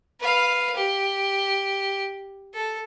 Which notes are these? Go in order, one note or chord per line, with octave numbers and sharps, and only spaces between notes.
B4 F5
G4
A4